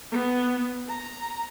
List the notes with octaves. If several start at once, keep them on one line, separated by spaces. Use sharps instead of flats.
B3
A#5